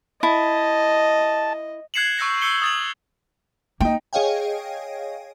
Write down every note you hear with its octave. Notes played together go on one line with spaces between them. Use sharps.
E4 D#5 A5
F#6 G#6 C7 C#7 E7 F#7
C#6 E6 G6 A#6 C#7
E6 G6 C#7 G7
D#6 A6 F#7
A#3 D#4 G5
G#4 C#5 D#5 F5 G5 G#5